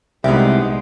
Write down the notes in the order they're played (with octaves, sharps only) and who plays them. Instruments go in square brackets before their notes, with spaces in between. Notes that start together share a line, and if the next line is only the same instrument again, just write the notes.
[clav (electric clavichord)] C2 E4 [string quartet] G#3 [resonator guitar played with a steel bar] B3 D#4 G4 [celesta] E5